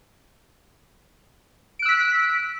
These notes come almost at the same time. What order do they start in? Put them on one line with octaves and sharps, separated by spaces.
D7 F#6 E6 B6